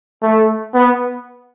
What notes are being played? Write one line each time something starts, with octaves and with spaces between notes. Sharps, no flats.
A3
B3